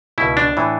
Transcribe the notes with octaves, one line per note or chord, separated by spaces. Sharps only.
C#2 B2 E4
D4
A2 E3